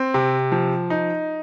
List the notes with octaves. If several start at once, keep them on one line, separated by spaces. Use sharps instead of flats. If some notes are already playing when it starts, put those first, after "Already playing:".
Already playing: C4
C3
F3
D#4